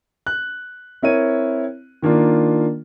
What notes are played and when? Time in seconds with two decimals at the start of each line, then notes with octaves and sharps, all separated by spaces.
0.27 F#6
1.02 C4 E4 A#4 C#5 D#7
2.02 D#3 A#3 D4 F4